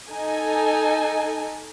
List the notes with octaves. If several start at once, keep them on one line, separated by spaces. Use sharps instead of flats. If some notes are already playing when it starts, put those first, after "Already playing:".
D#4 A4 G#5